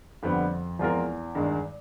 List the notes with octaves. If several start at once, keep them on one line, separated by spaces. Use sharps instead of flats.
F2 D3 G3 B3
E2 F3 G#3 C4 F4 A#4
G2 D#3 G#3